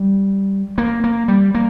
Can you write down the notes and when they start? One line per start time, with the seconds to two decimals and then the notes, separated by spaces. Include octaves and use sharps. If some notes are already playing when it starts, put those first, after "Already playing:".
Already playing: G3
0.78 A#3
1.04 A#3
1.28 G3
1.55 A#3